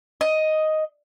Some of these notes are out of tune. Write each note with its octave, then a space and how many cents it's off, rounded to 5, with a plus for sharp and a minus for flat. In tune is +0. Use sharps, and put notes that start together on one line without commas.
D#5 +5